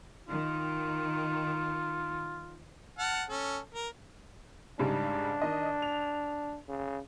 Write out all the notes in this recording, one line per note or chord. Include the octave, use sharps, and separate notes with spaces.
D#3 F4
F#5 A5 F6
C#4 A4
A#4
G#2 C#3 G3 D4
D#3 D#5
F7
C#3